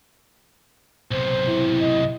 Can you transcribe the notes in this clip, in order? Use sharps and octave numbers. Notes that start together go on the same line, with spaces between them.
B1 C3 C5
E4
D#5